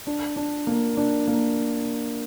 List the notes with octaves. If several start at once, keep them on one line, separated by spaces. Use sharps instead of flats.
D4
D4
A#3
D4
A#3